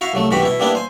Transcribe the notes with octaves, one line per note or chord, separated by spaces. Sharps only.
E4 F#4 F5
C2 F#3 A3
C2 G#2 E3 F#4 G4 B5
B2 E4
G3 A#3 B3 D4 E4
C5 G#5